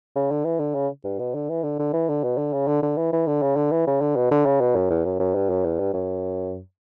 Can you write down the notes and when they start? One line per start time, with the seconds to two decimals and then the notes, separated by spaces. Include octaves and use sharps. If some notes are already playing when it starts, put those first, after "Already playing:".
0.16 C#3
0.31 D3
0.45 E3
0.59 D3
0.75 C#3
1.04 G2
1.19 B2
1.34 D3
1.50 E3
1.64 D3
1.79 D3
1.93 E3
2.09 D3
2.23 B2
2.37 D3
2.53 C#3
2.67 D3
2.82 D3
2.97 E3
3.13 E3
3.27 D3
3.42 C#3
3.56 D3
3.71 E3
3.87 C#3
4.01 D3
4.16 B2
4.31 D3
4.46 C#3
4.61 B2
4.75 F#2
4.90 E2
5.05 F#2
5.20 F#2
5.35 G2
5.50 F#2
5.64 E2
5.80 G2
5.93 F#2